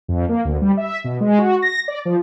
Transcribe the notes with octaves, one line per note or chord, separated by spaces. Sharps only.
F2
A#3
D2
G3
E5
B2
G#3
F#4
A#6
D5
F3